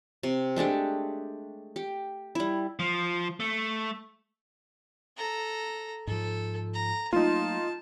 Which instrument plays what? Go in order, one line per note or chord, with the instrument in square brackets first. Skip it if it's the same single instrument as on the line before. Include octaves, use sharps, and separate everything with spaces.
[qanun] C3
G#3 A3 D4 G4
G4
G3 E4
[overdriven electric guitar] F3
A3
[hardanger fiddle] A4 A#5
[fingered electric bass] G#2 F3 [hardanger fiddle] A4
[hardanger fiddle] A#5
[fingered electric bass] F#3 A3 A#3 [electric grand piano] D#4 F4 [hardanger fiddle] A5